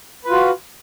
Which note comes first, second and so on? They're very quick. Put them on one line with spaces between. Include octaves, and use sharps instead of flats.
B4 F4 F#4